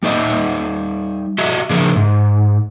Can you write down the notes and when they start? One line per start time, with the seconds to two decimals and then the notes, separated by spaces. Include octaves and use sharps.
0.03 G3 D#4 D#5 E5
1.38 F#4 G4 D#5 E5
1.70 C#3 F3 D4 G#4 A#4 E5
1.96 G#2